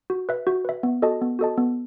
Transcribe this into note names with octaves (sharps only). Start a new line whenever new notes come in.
F#4
B4 E5
F#4
B4 E5
B3
F#4 A4 D#5 A5
B3
F#4 A4 D#5 A5
B3